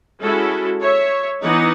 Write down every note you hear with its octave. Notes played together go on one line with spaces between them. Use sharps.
G#3 C#4 E4 F#4 A4
C#5 E5
E3 B3 D#4 D#5 F#5